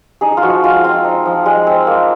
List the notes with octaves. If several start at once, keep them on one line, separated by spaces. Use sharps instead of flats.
D#4 G#4
F4
F3 F#4
G#3 F4
C4 F4
D#4
F3
G#3
C4
A#3